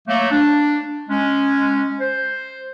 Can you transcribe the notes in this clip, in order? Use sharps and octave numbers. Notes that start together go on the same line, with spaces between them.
F#3 A3 A#3
D4
G#3 C#4
C5